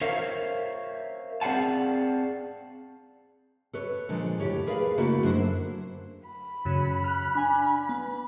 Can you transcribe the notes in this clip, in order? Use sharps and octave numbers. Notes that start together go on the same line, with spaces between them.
A#4 C5 C#5 E5 F5
C4 G#4 D5 F5 F#5 A5
A4 B4 C#5
A#2 D3 F3 G#3
D2 E4 G4 C#5
G#4 A#4 B4 D5 E5 F5
C#3 A3 A#3 E4 F#4
F#2 D3 D4 E4 C5
B5
F#2 C#3
F6 F#6
D4 G#5
B3